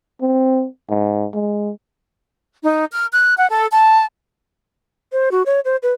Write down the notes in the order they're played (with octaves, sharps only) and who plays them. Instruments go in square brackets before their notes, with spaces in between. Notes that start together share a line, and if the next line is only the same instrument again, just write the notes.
[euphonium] C4
G#2
G#3
[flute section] D#4
F6
F#6
F#5
A4
A5
[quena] C5
F#4
C#5
C5
B4